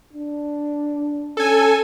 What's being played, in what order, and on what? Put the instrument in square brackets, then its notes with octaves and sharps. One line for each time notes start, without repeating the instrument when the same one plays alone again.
[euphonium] D4
[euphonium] C#4 [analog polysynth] A4 G#5